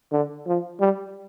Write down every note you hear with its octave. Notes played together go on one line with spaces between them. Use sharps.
D3
F3
G3